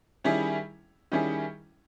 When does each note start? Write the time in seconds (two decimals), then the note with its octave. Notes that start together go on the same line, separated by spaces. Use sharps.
0.24 D#3 G3 C#4 E4 G#4
1.12 D#3 G3 C#4 E4 G#4